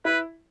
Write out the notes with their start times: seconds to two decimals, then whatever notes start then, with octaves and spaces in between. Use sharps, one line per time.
0.05 E4 B4